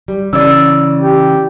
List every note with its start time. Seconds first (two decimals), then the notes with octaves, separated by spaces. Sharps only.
0.08 G3
0.33 C#3 E3 C#4 D5 E6
0.99 G4